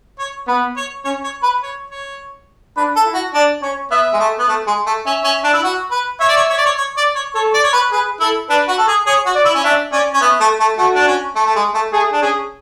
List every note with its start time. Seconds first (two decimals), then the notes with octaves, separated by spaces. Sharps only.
0.19 C#5
0.47 B3 B4
0.77 C#5
1.05 C#4 C#5
1.24 C#5
1.43 B4
1.63 C#5
1.90 C#5
2.77 D4 B4
2.96 A4
3.05 E4
3.14 F#4
3.34 D4 D5
3.62 C#4 C#5
3.91 B3 E5
4.13 G#3
4.20 A3
4.39 B3
4.48 A3
4.67 G#3
4.86 A3
5.06 C#4 E5
5.24 C#4
5.44 D4
5.53 E4
5.63 F#4
5.91 B4
6.20 C#5 E5
6.28 D5
6.36 C#5
6.49 C#5
6.57 D5
6.65 C#5
6.77 C#5
6.97 D5
7.15 C#5
7.35 A4 C#5
7.54 D5
7.63 C#5
7.73 B4
7.91 G#4 B4
8.20 E4 A4
8.49 D4 B4
8.68 F#4
8.78 A4
8.88 G#4
9.07 G#4 C#5
9.26 F#4
9.35 D5
9.45 E4
9.55 C#4
9.64 D4 E5
9.92 C#4 D5
10.14 C#4
10.21 B3 E5
10.40 A3
10.60 A3
10.78 A3 F#4
10.95 D4
11.07 C#4
11.35 A3
11.46 A3
11.55 G#3
11.74 A3
11.93 A3 G#4
12.12 D4
12.21 C#4 G#4